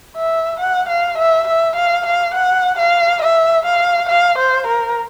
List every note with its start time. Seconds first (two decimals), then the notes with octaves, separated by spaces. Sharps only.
0.17 E5
0.60 F#5
0.89 F5
1.18 E5
1.48 E5
1.76 F5
2.06 F5
2.34 F#5
2.79 F5
3.22 E5
3.66 F5
4.09 F5
4.38 C5
4.67 A#4